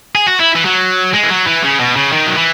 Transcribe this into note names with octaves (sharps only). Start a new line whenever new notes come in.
G#4
F#4
E4
E3
F#3
G#3
E3
F#3
E3
C#3
B2
C#3
D#3
F#3
E3